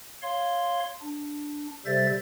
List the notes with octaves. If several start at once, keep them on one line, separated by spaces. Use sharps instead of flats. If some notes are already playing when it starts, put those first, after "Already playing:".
C#5 F5 C6
D4
C3 G3 A4 C5 E5 A6